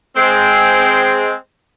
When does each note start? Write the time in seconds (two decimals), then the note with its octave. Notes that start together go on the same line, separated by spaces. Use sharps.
0.16 G#3 C4